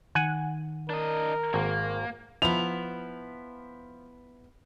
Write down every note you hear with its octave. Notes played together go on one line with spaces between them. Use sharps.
D#3 F#5 G#5
D4 A#4 D#5
G#1 A#3
F3 B3 E4 F7